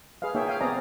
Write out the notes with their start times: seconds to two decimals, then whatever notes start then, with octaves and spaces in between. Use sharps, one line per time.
0.22 G#4 B4 D#5 F5
0.35 A#3 D#4 G#4 C#5 E5 G5
0.47 C#5 F5 G5 G#5
0.60 B3 C4 G#4 D5 D#5 A#5